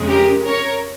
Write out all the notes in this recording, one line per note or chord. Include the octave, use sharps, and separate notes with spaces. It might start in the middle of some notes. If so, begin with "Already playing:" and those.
Already playing: F2 C#3 G#3
G4 A#4
A#4 C#5